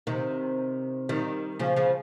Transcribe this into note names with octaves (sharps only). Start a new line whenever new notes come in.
C3 D#3
D#3 G3
C#3 F3
C#3 F3